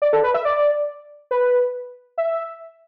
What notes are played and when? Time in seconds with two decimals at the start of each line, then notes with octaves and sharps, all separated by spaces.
0.02 D5
0.13 A4
0.24 B4
0.34 E5
0.45 D5
1.31 B4
2.18 E5